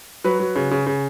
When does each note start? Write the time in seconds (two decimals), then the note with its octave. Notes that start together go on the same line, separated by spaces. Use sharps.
0.24 F#3 B4
0.39 F#3
0.56 C#3
0.71 C#3
0.86 C#3